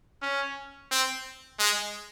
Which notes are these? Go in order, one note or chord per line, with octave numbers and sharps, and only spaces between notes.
C#4
C4
G#3